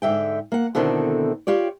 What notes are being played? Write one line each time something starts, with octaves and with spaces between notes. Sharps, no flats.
G#2 D3 E5 G5
A#3 F#5
B2 D3 D#3 C4 E4 A4
F4 G4 C#5 D5